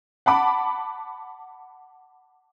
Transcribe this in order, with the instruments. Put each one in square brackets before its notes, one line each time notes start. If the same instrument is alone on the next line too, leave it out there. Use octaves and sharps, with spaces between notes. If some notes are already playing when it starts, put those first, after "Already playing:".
[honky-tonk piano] F#5 A5 B5 D6